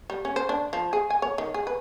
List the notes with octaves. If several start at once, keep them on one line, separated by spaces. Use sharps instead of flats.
G3
C#4
C5
D4
F3
G#4
G#5
C#5
D#3
G#4
B4